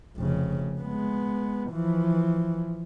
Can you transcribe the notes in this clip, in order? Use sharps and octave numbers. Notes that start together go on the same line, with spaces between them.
F1 C#3
G#3 B3
E3 F3